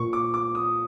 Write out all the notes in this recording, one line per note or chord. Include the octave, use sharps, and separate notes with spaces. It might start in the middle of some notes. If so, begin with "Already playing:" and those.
Already playing: A#2 C#6
D6
D6
D#6